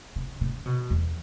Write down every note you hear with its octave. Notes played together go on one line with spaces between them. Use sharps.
C#3
C#3
B2
E2